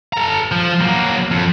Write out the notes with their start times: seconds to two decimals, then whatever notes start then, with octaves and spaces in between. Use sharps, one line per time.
0.13 A4 A#5
0.52 F3
0.81 F#3 A#3
1.31 F2